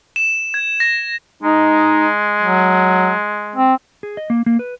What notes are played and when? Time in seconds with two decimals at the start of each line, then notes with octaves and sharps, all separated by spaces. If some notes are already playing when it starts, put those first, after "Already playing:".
0.16 E7
0.54 G#6
0.80 A#6
1.43 G#3 D#4
2.41 F#3
3.56 C4
4.03 G#4
4.17 D#5
4.30 A#3
4.46 A#3
4.59 B4